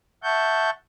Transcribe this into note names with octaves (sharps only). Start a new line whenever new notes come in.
E5 F#5 A5 C#6 G6